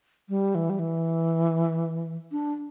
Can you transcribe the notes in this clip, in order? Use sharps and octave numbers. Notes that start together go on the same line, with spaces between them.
G3
E3
G3
E3
D4